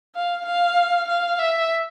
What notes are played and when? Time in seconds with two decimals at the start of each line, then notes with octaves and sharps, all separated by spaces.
0.15 F5
0.46 F5
1.08 F5
1.39 E5